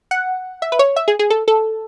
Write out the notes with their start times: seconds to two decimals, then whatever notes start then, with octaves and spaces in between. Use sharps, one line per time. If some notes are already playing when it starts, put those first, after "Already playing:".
0.11 F#5
0.62 E5
0.72 B4
0.79 C#5
0.96 E5
1.08 G#4
1.19 G#4
1.30 A4
1.48 A4